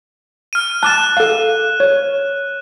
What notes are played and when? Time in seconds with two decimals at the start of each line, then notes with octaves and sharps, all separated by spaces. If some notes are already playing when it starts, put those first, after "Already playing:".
0.53 F6 D#7
0.83 A5 D6 F#6 A6 E7
1.17 A4 F5
1.80 C#5